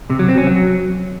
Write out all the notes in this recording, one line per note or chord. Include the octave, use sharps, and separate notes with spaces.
C3
F#3
C4
C#4
F#3